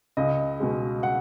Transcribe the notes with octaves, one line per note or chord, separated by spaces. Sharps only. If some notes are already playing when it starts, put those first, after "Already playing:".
C#2 D#5
B2 G#3
F#5